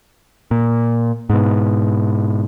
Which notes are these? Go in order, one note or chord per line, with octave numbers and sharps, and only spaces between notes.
A#2
G#2 B2